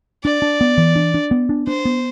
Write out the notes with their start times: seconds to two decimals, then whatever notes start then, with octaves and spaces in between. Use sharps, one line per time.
0.24 D4 D5
0.42 D4
0.61 B3
0.78 E3
0.96 D4
1.14 D4
1.31 B3
1.49 D4
1.67 D4 C5
1.85 B3